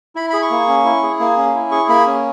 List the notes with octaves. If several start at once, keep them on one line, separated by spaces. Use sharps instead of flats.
E4 B5
G#4 B5
C#6
A#3
C#4
E4
G#4
A#3
C#4
E4
G#4 C#6
A#3 B5
C#4